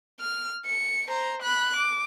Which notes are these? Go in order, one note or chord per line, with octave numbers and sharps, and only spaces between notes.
F6
C#7
C5 A#5
B5 F#6
D6